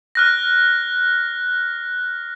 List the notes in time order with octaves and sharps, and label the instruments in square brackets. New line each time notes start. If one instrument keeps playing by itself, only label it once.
[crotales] F6 F#6 A#6